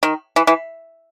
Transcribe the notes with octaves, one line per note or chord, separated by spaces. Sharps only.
D#3
E3
E3